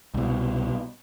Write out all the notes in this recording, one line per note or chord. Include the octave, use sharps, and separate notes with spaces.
C2 B2